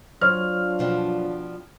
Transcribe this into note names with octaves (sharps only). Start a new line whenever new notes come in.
F#3 D4 F4 C5 C#5 F6
B2 F3 G3